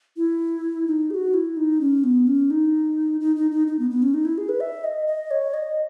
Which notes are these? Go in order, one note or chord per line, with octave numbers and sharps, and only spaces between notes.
E4
D#4
G#4
F#4
E4
D#4
C#4
B3
C#4
D#4
D#4
D#4
D#4
D#4
B3
B3
C#4
D#4
E4
G#4
B4
E5
D#5
D#5
C#5
D#5